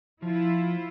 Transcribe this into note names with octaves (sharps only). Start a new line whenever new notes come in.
F3 E4 F4